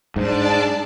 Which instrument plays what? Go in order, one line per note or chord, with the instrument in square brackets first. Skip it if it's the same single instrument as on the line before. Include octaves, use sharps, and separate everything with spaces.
[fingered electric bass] G#2 [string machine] D4 D5 A5